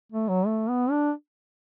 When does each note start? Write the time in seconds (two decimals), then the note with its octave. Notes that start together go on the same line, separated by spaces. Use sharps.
0.12 A3
0.28 F#3
0.46 A3
0.69 B3
0.91 D4